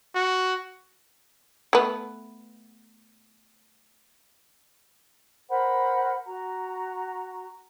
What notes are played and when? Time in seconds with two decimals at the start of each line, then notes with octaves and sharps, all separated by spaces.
0.15 F#4
1.73 A3 B3
5.50 A#4 C5 F#5 B5
6.25 F#4 A#5